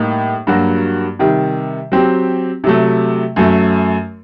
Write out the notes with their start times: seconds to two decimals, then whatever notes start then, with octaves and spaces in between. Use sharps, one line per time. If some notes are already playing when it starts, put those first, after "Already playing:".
Already playing: A2 G3 A#3 D#4 G4
0.47 G2 F#3 A#3 F#4
1.19 C3 D#3 G3
1.92 F#3 C4 G4
2.64 C3 F#3 A3
3.36 F#2 F#3 A3